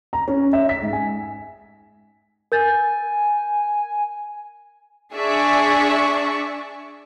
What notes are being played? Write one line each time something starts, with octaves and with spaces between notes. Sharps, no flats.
A#5
C#4
E5
B6
G#2
G#5
A#4 G#5 G6 A6
D4 G#4 D5 E5 C#6